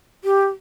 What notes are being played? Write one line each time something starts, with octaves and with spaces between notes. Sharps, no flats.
G4